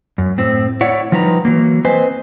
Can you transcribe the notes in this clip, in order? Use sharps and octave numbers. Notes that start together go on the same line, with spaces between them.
F#2
A2 C4
E4 C#5 D5 F#5
F3 G3 D#4 B4 A#5
E3 F#3 A#3
C4 B4 C5 D#5 G#5